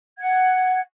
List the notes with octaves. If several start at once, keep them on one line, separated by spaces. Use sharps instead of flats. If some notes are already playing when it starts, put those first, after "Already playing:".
F#5 G#6